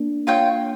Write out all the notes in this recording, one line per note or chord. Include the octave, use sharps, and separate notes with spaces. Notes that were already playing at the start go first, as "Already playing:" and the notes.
Already playing: A#3 D4
F4 C#5 G5